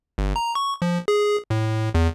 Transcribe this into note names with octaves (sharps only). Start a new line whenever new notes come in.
G1
A#5
C#6
F3
G#4
A2
E2